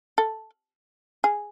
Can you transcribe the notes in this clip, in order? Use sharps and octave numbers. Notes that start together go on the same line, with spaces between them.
A4
G#4